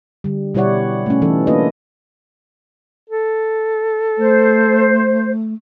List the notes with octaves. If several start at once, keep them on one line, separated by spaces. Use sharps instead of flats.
D3 G3
B2 G3 E4 C#5 D5 F#5
A3 C#4
E3 C#4 D#4 A4
A#3 D4 F4 A4 B4 D#5
A4
A3 C5